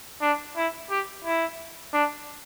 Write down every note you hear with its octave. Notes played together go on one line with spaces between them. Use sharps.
D4
E4
G4
E4
D4